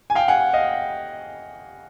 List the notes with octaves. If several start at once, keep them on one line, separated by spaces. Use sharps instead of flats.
G#5
F5 G5
F#5 G#5
D#5 F5